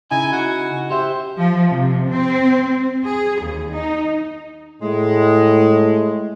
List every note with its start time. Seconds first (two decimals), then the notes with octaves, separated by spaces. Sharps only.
0.11 C#3 D#4 E4 G#5
0.32 F#4
0.91 G4 C5 E5
1.39 F3
1.71 C3
2.08 C4
3.04 G#4
3.42 D#2
3.72 D#4
4.82 A2 G#3